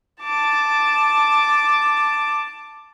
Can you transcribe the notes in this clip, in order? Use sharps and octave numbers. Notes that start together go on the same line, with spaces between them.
A5 D6